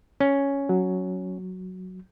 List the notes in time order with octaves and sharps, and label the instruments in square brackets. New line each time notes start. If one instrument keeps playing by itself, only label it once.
[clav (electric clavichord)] C#4
[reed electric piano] F#3